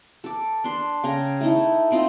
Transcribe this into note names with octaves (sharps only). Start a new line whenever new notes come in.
A4 D6
D4 C6
C#3 G5 G#5 A#5
A3 D#4 E4
A3 C4 D#4 F4